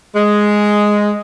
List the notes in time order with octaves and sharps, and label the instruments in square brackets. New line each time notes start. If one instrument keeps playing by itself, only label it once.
[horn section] G#3